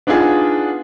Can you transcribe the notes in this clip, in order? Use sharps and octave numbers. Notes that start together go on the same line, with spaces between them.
B3 D4 D#4 F4 G#4